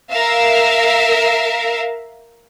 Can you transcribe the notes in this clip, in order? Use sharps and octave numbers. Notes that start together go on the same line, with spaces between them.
A#4 E5 F5